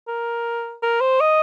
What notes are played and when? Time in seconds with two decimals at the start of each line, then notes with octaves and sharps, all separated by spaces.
0.07 A#4
0.82 A#4
1.01 C5
1.20 D#5